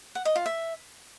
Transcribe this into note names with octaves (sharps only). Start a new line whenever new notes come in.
F#5
D#5
F4
E5